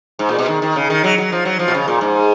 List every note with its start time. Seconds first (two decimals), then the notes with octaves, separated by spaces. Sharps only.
0.19 G#2
0.29 A#2
0.39 B2
0.48 D#3
0.62 D#3
0.76 C#3
0.90 D#3
1.04 F#3
1.18 F#3
1.32 F3
1.45 F#3
1.59 F3
1.68 B2
1.74 C#3
1.88 A#2
2.01 G#2